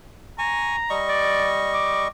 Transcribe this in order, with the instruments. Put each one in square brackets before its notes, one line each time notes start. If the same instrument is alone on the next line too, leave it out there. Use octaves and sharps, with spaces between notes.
[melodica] G#5 C#6 [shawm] A#5
[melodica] G3 D#5 C#6
[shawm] D5
D6